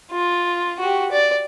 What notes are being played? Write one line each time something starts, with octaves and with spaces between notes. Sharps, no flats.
F4
F#4 G4
D5